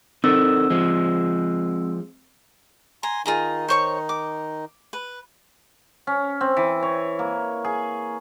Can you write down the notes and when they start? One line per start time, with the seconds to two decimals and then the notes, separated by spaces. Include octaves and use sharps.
0.24 C4 D#4 A4 A#4 E6
0.70 F3 G#3
3.03 G#5 A#5 C6
3.26 D#3 D#4 F4 G#4 A#5
3.68 C5 C#5 C#6
4.09 D6
4.93 B4
6.07 C#4
6.41 C4
6.57 E3
6.83 C#5
7.19 A#3
7.64 G#4